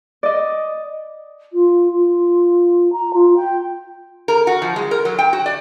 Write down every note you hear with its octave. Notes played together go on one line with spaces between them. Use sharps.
D5 D#5
F4
F4
A#5
F4
G5
A#4
F#4
F3
G#3
A#4
F#3
G5
F#4
D5